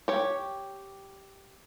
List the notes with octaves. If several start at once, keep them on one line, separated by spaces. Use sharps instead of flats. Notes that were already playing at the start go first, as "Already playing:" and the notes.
G4 C#5